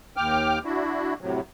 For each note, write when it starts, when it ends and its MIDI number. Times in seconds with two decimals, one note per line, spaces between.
0.17 0.59 39
0.17 0.59 79
0.17 0.59 86
0.17 0.59 89
0.65 1.14 62
0.65 1.14 64
0.65 1.14 66
1.21 1.40 45
1.21 1.40 48
1.21 1.40 54